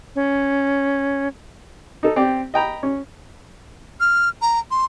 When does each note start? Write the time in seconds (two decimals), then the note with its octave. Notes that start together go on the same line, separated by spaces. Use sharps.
0.15 C#4
2.03 D#4 A4
2.16 C4 G4 D5
2.54 D#5 G5 A#5 B5
2.83 C#4
4.00 F6
4.42 A#5
4.71 C6